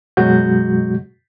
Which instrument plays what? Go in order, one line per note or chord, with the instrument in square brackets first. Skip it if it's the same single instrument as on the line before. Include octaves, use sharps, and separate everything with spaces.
[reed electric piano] F#2 B2 F#3 G#3 F#4 G6